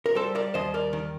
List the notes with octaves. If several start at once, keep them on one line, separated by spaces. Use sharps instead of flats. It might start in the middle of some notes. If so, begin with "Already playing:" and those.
A#4
G3 A4 C5
A#4 D5
D#2 C5 D#5
A#4 D5
D#3